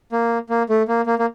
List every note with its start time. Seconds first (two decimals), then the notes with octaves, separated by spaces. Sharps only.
0.12 A#3
0.50 A#3
0.69 A3
0.88 A#3
1.06 A#3
1.19 A#3